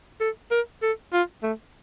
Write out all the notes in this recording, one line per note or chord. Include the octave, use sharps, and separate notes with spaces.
A4
A#4
A4
F4
A3